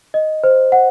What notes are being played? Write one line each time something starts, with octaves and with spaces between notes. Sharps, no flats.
D#5
C5
F#5